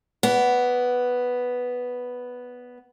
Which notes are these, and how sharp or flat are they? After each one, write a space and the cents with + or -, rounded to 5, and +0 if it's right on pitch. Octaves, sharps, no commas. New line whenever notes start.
B3 +0 D5 -30